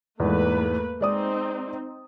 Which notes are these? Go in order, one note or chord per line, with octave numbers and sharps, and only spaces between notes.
E2 G#2 E3 A3 A#3 B4
G#3 C4 D#4 D5 D#6